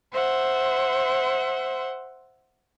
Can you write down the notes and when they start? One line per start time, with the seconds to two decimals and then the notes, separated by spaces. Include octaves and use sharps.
0.12 C5 E5 F#5 C6